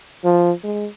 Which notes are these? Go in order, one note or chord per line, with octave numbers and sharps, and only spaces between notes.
F3
G#3